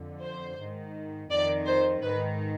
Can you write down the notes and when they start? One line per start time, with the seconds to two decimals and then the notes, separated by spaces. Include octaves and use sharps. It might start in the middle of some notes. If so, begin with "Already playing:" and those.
Already playing: F2 D3
0.22 C5
0.59 G#2 D#3
1.30 F2 D#3 D5
1.66 C5
2.02 G#2 D#3 B4